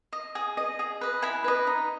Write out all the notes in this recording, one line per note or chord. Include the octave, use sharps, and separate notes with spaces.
D#5
G#4
D#5
G#4
B4 D#5
E4 G#5 B5
B4 D#5
D#4